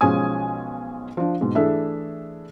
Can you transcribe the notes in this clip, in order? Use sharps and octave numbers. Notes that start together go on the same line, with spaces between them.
B1 F3 G#3 C#4 G#5 D#6
F3 D4
G#2 B2
E3 A3 D4 G#4 A4 E5